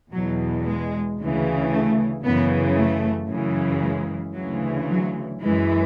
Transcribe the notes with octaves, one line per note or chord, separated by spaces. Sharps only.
E2 B2 F#3
G#3
D2 C#3 E3
A3
F#2 C#3 E3 B3
A3
F#2 C#3 E3
G#3
D2 C#3 E3 F#3
F#3
F#2 E3 G#3